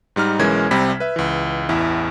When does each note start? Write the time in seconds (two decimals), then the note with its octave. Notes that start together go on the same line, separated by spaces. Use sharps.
0.16 G#2 G3 D#4 F6
0.39 B1 E3 G#3 C#4 A#4 G#6
0.71 C2 C3 G3 C4 B5 B6
1.00 B4 E5
1.16 C#2 E3
1.69 A1 E2 E4